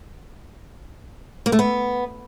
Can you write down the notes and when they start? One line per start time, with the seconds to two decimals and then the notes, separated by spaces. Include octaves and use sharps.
1.46 A#3
1.52 A3
1.59 B3